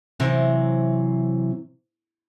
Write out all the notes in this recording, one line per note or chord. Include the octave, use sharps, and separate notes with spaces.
C3 E3 F#3 C4